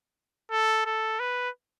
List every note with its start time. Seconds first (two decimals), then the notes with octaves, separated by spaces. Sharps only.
0.51 A4
0.86 A4
1.19 B4